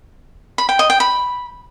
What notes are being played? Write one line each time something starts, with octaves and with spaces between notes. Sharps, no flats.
B5
G5
D#5
G5
B5